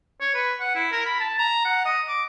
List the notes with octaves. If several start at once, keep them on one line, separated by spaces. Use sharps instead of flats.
C#5
B4
F#5
E4
A#4
B5
A5
A#5
F#5
D#5
D6